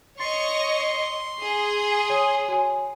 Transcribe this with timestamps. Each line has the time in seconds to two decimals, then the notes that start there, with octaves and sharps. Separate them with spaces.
0.20 C#5 D#5 C6 C#6 A6
1.40 G#4
2.10 C#5 G#5 D#6
2.48 F#4 C#5 G#5